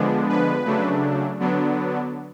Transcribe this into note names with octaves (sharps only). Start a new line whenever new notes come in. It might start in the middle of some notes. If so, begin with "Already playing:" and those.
Already playing: D3 F3 G#3 B3 D4
B4
C#3 F#3 A3 D4
D3 F#3 B3 D4